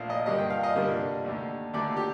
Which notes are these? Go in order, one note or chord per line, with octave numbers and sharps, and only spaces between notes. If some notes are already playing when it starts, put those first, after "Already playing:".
Already playing: A#1 A#2 A3 F5
D#5
G2 D3 G3 A#3 D#5
G5
F5
D#5
G2 D3 G3 A#3
D#2 D3 A3
D#2 D3 A3 D5
G4